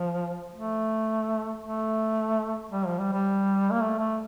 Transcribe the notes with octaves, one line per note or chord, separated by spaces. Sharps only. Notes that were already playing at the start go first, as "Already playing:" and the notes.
Already playing: F3
A3
A3
G3
F3
G3
G3
A#3
A3
A3